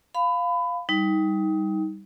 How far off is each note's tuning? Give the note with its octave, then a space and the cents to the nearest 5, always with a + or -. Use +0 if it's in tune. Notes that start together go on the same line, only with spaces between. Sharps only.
F5 +0 B5 +25
G3 +0 D#4 +25